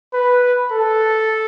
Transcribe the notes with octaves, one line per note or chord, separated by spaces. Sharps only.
B4
A4